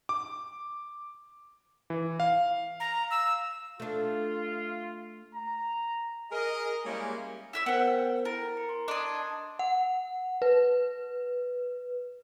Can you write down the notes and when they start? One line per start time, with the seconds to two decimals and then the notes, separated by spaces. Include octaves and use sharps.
0.09 D6
1.90 E3
2.20 F5
2.80 A#5
3.11 E6
3.80 A3 D4 F4
5.35 A#5
6.31 G#4 A#4 D#5
6.85 G3 G#3 A#3 C#4 E4 G4
7.53 E4 E5 E6
7.66 B3 A#4 C5 F#5 G5
8.25 E4 A#4 A6
8.57 A#5 C#7
8.69 C6
8.88 D4 D#5 C6 D#6 G#6
9.59 F#5
10.42 B4